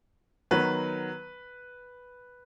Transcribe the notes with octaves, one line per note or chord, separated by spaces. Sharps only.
D#3 F#3 B3 B4